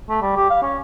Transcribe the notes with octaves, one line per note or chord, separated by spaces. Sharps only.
A3
G3
G4
F5
C#4